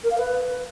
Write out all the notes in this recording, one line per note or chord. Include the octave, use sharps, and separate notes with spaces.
A#4
F5
B4